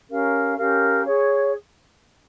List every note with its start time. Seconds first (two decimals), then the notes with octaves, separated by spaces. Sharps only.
0.09 C#4 G4 A#4 F5
0.57 C#4 G4 A#4 F5
1.05 G#4 C#5